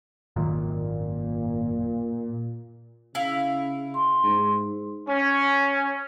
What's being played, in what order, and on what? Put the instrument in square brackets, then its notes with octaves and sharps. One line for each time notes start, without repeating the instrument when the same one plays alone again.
[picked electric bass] G#1 F#2 D#3 [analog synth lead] A#2
[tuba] C#3 [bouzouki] E4 F5
[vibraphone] C6
[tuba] G#2
[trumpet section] C#4